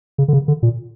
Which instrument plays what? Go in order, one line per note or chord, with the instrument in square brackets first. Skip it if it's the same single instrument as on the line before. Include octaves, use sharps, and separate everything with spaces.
[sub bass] C#3
D3
C#3
D3
A#2